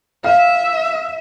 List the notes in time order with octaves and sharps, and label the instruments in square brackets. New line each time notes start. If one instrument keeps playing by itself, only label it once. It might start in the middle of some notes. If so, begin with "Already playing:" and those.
[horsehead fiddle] E5 [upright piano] F5